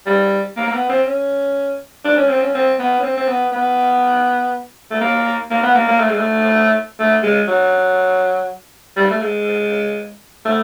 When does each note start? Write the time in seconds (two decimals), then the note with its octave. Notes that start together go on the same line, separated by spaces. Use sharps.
0.06 G3
0.57 A#3
0.67 A#3
0.73 B3
0.89 C4
1.06 C#4
2.05 D4
2.17 C#4
2.29 C4
2.42 C#4
2.55 C4
2.79 B3
3.00 C#4
3.03 C4
3.17 C4
3.28 B3
3.53 B3
4.91 A3
5.01 A#3
5.51 A#3
5.63 B3
5.75 A#3
5.88 A#3
6.00 A3
6.09 G#3
6.17 A3
6.99 A3
7.23 G#3
7.48 F#3
8.96 G3
9.10 A3
9.22 G#3
10.45 A3